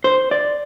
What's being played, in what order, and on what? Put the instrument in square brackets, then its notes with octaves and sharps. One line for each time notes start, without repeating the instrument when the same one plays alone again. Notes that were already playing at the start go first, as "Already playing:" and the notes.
[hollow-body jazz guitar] C5
D5